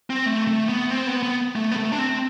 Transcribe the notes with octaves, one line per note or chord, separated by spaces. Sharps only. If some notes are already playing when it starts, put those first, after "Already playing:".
C4
A3
A3
B3
C4
B3
B3
A3
B3
A3
D4
C4